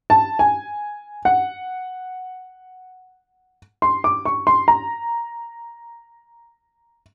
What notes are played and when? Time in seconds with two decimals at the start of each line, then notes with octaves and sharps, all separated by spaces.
0.10 A5
0.39 G#5
1.25 F#5
3.82 C6
4.04 D6
4.25 C#6
4.47 C6
4.68 A#5